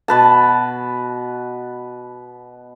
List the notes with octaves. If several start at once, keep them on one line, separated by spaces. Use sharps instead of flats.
B2 B4 A5